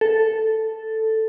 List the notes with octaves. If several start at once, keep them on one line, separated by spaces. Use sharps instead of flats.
A4